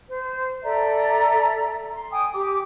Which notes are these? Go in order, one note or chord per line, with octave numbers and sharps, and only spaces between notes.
C5
A4 D5 E5 A#5
C6
G5 G#5 D#6
G4 D6